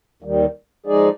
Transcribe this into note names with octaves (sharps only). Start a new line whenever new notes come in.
D#2 D#3 G3
F3 G#3 D#4 G#4 D5